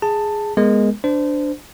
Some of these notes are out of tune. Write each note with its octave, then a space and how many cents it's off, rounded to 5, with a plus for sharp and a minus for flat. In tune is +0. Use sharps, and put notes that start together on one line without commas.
G#4 +0 A5 +10
G#3 +0 B3 -15 A#4 +0
D4 +0 C5 -25